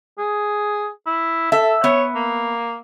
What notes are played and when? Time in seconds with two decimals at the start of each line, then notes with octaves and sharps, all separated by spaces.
0.19 G#4
1.07 E4
1.52 A4 E5
1.84 B3 C#5
2.15 A#3